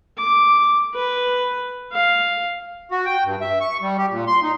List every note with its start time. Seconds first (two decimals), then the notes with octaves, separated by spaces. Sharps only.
0.18 D6
0.95 B4
1.93 F5
2.91 F#4
3.06 G5
3.25 G2
3.41 E5
3.61 C#6
3.82 G3
3.98 G4
4.11 A#2
4.27 C6
4.43 D#4